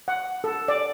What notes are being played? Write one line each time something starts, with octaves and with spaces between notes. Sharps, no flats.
F#5
A4
D5